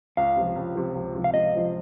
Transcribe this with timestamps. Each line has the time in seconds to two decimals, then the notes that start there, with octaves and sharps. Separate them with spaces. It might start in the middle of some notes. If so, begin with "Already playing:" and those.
0.17 C#2 F5
0.36 C3 F3
0.56 C#2
0.76 C3 F3
0.95 C#2
1.15 C3 F3
1.24 F5
1.34 C#2 D#5
1.53 C3 F3